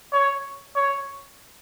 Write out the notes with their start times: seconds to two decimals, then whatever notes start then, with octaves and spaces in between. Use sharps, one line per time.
0.12 C#5
0.76 C#5